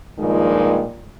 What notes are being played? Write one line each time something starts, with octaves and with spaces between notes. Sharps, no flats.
G2 A#2 D#3 F3 G#3